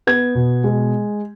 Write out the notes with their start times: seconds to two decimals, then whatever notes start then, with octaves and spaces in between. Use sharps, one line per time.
0.07 B3 G#6
0.35 B2
0.64 G#3